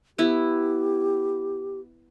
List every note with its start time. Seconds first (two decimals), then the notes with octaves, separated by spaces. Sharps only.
0.18 B3 E4 G4